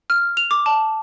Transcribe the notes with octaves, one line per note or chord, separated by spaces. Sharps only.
F6
F7
D6
A5